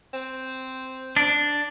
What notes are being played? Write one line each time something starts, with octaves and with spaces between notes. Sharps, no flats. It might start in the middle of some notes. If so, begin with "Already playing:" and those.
C4
D4